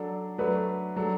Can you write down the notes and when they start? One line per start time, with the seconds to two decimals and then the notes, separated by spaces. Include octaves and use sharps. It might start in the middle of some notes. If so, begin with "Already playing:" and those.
Already playing: F#3 D4 A4
0.38 F#3 A3 D4 B4
0.96 F#3 D4 A4